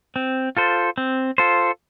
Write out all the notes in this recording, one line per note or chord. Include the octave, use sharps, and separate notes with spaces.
C4
F4 A4 C5
C4
F4 A4 C5